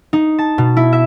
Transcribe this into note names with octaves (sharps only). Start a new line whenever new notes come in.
D#4
A5
B2
E4
E5